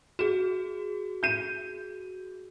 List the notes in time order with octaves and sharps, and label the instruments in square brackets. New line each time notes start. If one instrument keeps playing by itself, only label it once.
[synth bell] F#4 G#4 [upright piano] E7
[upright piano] G6 D#7